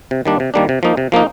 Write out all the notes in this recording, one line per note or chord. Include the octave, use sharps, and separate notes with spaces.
C3
D#3 G3 A#3 D4
C3
D#3 G3 A#3 D4
C3
F3 A#3 D#4
C3
F3 A#3 D#4